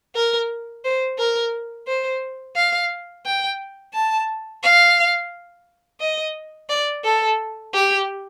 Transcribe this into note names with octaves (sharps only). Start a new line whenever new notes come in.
A#4
C5
A#4
C5
F5
G5
A5
F5
D#5
D5
A4
G4